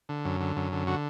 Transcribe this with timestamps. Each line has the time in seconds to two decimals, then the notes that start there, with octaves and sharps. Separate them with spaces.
0.09 D3
0.25 F#2
0.41 D3
0.56 F#2
0.72 D3
0.87 D3 F#4